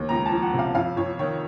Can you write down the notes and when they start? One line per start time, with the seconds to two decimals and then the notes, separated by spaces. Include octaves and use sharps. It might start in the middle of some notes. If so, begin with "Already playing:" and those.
Already playing: D#2
0.09 C#2 A#5
0.26 A5
0.31 F3
0.42 F#5
0.53 C3
0.59 F5
0.74 F2 F5
0.96 F2 C#5
1.19 D#3 C#5